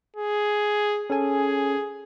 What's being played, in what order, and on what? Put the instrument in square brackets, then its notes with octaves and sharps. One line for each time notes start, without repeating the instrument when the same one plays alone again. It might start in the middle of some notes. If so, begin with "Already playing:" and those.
[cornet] G#4
[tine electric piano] C#4 A4 G#5 [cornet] G#4